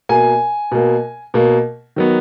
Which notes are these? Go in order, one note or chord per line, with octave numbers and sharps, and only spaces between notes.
B2 A#3 G#5
B2 A#3
B2 A#3
D#3 F#3 B3